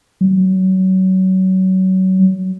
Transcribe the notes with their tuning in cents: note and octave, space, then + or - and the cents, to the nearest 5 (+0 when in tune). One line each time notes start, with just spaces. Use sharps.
F#3 +25